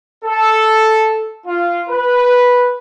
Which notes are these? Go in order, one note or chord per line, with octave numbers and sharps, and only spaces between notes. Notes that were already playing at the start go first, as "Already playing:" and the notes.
A4
F4
B4